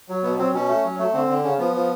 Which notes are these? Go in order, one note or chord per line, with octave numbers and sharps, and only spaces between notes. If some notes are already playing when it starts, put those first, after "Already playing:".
F#3
B2 B3
F#3 C4
B2 C#4
A3
F#3
A3
D3 C4
D3
C#3 C#4
F3 B3
F3